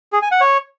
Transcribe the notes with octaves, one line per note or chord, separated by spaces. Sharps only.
G#4
G#5
F#5
C#5